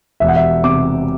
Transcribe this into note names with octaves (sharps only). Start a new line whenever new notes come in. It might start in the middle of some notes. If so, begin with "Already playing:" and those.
E1 E5
F#5
E5
C3 D6